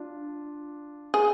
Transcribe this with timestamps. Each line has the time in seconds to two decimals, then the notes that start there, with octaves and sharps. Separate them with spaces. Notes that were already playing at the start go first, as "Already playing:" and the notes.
Already playing: D4 F4
1.14 G#4